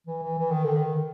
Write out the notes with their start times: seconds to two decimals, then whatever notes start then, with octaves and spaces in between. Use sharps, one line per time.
0.06 E3
0.22 E3
0.38 E3
0.51 D#3
0.64 D3
0.76 D#3